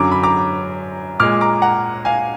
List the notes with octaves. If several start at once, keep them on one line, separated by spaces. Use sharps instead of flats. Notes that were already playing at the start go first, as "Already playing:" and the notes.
Already playing: F#2 D3 F#3 A#5 D6
B5
A#5 D6
A#2 G#3 D6 F6
A#5 D6
F#5 A#5
F5 G#5